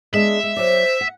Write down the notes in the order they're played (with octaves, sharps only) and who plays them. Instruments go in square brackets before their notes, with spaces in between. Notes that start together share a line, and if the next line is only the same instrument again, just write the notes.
[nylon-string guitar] G#3 B3 D4 [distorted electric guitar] E5
[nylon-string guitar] G#3
[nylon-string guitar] F#3 D5 [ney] C5
[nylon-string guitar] F#5